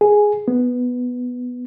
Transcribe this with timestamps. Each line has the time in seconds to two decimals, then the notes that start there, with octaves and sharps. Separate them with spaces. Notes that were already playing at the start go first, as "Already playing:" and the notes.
0.01 G#4
0.48 B3